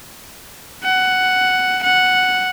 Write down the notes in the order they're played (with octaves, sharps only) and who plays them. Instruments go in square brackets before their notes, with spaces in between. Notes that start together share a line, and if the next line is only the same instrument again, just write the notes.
[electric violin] F#5
F#5